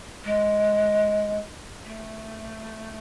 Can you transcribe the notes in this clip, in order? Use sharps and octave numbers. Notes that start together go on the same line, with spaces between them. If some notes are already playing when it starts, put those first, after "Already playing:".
G#3
A3